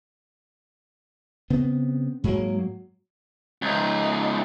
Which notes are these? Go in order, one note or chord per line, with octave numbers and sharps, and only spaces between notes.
C#3 B3 C4
G#2 F#3 G#3 A#3
C#2 D#4